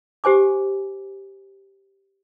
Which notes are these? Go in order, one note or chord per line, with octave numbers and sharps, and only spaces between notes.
G4 C5 G#5 D6